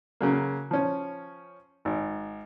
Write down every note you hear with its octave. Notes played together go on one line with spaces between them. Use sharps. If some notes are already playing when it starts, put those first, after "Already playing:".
C#3 F#3 A#3
F3 C#4
G#1